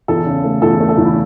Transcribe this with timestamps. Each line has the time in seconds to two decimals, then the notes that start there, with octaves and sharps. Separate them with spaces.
0.08 E2 A4
0.26 C#3
0.44 A3
0.62 E2 A4
0.81 A3
0.89 A4
0.98 E2
1.05 E4